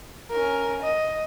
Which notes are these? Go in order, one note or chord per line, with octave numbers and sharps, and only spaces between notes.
C#4 A#4
D#5